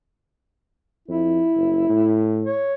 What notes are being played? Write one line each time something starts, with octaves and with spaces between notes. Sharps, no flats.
F2 E4
F#1
A2
C#5